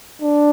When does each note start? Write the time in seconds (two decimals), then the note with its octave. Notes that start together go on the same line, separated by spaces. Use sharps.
0.22 D4